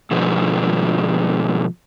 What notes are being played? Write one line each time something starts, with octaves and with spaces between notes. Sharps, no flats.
G#2 B2 D3 F3